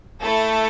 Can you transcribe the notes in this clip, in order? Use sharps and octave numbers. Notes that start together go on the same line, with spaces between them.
A3 E4 A4